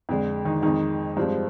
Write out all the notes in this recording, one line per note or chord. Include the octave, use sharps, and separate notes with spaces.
F2 D3 G#3
D#3 D#4
F2 D#3 G#3 D#4
G2 F3 G#3 C4